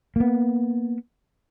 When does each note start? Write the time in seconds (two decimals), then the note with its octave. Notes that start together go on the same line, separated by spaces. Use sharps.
0.16 A#3 B3